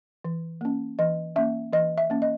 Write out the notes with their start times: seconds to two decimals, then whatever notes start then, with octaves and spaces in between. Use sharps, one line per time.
0.25 E3
0.61 A#3 C#4
0.99 E3 D#5
1.36 A#3 C#4 E5
1.73 E3 D#5
1.98 E5
2.10 A#3 C#4
2.22 D#5